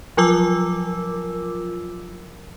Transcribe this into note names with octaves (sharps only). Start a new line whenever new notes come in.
F3 F#3 F4 A#4 D6 E6